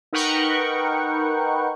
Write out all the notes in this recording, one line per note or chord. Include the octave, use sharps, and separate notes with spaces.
D#4 A#4 B4 F#5 G5 C#6